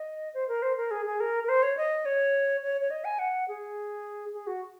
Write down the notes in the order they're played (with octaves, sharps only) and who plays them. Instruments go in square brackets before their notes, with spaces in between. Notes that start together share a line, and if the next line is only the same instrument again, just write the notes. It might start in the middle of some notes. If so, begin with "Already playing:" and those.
Already playing: [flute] D#5
C5
A#4
C5
A#4
G#4
G#4
A#4
A#4
C5
C#5
D#5
C#5
C#5
C#5
D#5
G#5
F#5
G#4
G#4
F#4